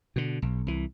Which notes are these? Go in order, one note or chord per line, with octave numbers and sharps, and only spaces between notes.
B2 D3
B1
C2 E3